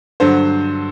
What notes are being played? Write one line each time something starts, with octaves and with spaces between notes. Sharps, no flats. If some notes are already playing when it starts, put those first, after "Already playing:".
G2 D3 F#3 C5